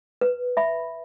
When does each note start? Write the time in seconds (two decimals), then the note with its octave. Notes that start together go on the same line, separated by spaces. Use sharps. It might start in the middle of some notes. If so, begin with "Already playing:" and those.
0.21 B4
0.57 E5 B5